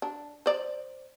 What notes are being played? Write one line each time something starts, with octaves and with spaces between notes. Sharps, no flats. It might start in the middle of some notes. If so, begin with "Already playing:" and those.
D4
C5 D5